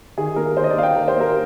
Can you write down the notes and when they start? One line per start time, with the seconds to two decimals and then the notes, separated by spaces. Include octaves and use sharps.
0.18 D#3 G#4
0.36 A#3 A#4
0.57 D#3 C5
0.64 D#5
0.70 D5
0.76 A#3 F5
0.83 G5
0.96 D#3 A#4
1.08 C5
1.16 A#3 A#4